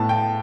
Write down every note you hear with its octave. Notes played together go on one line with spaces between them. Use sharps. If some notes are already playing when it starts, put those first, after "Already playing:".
Already playing: A2 B3 A5
G5